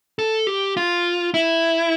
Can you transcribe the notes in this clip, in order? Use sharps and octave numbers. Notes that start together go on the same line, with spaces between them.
A4
G4
F4
E4